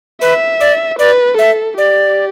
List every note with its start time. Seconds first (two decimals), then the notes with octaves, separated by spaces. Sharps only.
0.21 B4 E5
0.60 D5
0.99 B4 D5
1.38 A4 E5
1.78 G4 D5